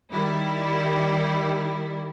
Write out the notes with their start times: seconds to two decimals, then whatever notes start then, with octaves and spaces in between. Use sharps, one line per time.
0.12 D#3 G3 E4